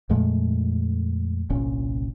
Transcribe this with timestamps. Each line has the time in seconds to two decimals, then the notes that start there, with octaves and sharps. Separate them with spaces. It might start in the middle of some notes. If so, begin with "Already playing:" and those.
0.09 F2 A#2 G#3 A3
1.50 G1 C2 A#2 C#4